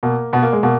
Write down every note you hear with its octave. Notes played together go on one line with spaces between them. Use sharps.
B2 A#3
B2 B3
A#3
G#3
B2 A#3